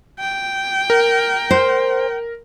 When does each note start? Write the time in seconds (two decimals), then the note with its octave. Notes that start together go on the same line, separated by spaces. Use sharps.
0.19 G5
0.90 A#4
1.51 C5